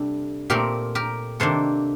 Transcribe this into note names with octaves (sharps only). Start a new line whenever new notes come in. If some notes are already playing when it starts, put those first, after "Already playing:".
Already playing: C3 G3 D4 A4
A#2 A3 C4 G4 A#4
G4 A#4
C3 D#3 A#3 D4 A4 C5